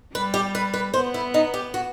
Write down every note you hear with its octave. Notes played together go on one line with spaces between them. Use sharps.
G3 B4
G4
B4
B4
B3 C5
E4
D#4
G4
F#4